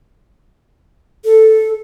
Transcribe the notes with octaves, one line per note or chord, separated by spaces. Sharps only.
A4